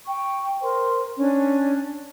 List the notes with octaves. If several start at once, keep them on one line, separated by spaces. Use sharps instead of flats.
G5 C#6
A#4 C5 C6
C#4 D4